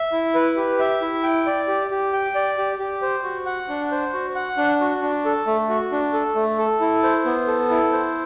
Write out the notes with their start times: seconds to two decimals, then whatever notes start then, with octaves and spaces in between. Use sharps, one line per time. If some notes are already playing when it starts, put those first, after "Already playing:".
Already playing: E5
0.12 E4
0.34 B4
0.56 G4
0.79 E5
1.01 E4
1.23 G5
1.46 D5
1.68 G4
1.91 G4
2.13 G5
2.35 D5
2.58 G4
2.79 G4
3.02 C5
3.24 F#4
3.46 F#5
3.69 D4
3.91 C5
4.13 F#4
4.36 F#5
4.57 D4
4.81 F#4
5.02 D4
5.25 A4
5.47 A3
5.69 F#4
5.92 D4
6.13 A4
6.35 A3
6.59 A4
6.81 E4
7.03 C5
7.25 B3
7.47 A4
7.70 E4
7.92 C5